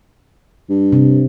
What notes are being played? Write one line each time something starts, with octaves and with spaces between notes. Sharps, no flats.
G2
C3